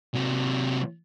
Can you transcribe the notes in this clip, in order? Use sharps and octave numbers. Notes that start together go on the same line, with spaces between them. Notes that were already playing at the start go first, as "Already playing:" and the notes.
C3 F#3